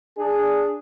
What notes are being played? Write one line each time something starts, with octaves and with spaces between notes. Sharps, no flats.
D4 G#4